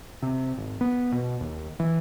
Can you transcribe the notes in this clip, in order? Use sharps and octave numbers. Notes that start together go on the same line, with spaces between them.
C3
G#1
B3
B2
D#2
E3